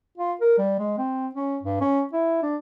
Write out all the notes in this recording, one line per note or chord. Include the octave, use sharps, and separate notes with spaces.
F4
A#4
G3
G#3
C4
C#4
G2
C#4
E4
D4